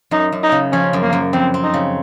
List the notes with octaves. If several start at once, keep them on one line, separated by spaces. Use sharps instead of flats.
F#2 D#4
F#2
D#4
C#3
F3 C#4
F#2
A#3
F#2
F2 C4
C4
D#4
C#3